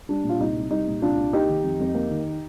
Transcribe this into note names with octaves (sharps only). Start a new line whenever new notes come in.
G3 D4
A#2
F4
C2 D#4
C2
G3 D#4
A#2
C2 D4 F4
C2
A#3 D#4 G4
D#3
F2
F2
A#3
D#3